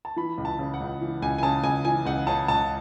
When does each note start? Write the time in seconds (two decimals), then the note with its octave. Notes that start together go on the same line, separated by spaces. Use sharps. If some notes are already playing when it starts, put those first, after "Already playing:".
0.05 A5
0.16 E3 B5
0.38 C#2
0.45 A5
0.59 C#3
0.74 F#5
0.80 C#2
1.02 E3
1.22 C#2 G#5
1.38 G#5
1.43 C#3 A5
1.63 C#2 G#5
1.85 E3 G#5
2.05 C#2 F#5
2.27 C#3 A5
2.48 C#2 A5